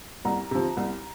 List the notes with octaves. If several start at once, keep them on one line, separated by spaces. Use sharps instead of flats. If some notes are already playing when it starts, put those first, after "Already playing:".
C2 A#5
C3 F3
C2